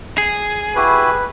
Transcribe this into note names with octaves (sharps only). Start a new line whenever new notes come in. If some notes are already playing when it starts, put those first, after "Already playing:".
G#4
E4 F#4 G4 B4